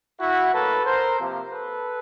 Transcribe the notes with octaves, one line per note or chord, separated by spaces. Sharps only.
E4 F#4
A2 F#3 A#3 A4 B4
A#4 C5
C3 F3 A#3
A4 B4